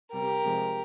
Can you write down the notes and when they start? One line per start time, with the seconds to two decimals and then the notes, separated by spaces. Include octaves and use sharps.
0.12 C3 G3 G4 A#4
0.43 C3 F3 G#3